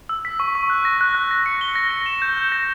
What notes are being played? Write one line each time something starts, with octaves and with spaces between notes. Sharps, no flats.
E6
B6
C#6
C#6
F#6
A#6
F#6
F#6
A#6
C#7
G7
A#6
C#7
E7
G6
G6
A#6